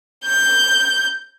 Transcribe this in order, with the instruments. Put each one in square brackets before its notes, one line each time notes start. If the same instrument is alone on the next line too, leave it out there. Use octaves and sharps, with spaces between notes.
[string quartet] G6